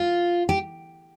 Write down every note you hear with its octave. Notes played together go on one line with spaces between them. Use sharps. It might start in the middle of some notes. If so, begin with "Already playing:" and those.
Already playing: F4
G4